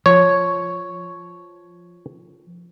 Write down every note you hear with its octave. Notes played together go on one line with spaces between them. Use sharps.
F3 C#5